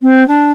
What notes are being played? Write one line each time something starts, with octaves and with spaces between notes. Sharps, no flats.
C4
D4